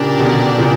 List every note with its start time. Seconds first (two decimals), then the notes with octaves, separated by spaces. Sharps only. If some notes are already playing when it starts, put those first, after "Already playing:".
Already playing: A#2 C#3 D4 G4 A#4 D5
0.19 B2 D3
0.58 A#2 C#3